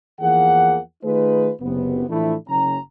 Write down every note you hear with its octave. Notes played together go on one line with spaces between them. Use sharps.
E2 E3 F3 A#3 G#4 F#5
D#3 A3 D#4 F4 G#4 B4
F#1 C3 B3
A2 E3 F3 A3 D4 E4
F#1 C#4 A#5